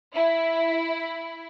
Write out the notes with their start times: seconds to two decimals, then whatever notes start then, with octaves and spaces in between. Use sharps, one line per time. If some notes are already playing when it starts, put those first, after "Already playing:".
0.15 E4 E5